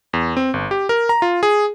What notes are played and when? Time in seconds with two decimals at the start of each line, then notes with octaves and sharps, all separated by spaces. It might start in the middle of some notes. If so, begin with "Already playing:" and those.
0.13 E2
0.37 C4
0.54 G1
0.71 G4
0.89 A#4
1.09 A#5
1.22 F4
1.43 G#4